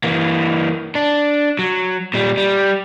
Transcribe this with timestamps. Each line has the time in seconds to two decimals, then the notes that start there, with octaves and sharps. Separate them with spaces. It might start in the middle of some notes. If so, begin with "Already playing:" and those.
0.04 E3 A#3
0.95 D4
1.59 F#3
2.14 A#2 G3
2.37 G3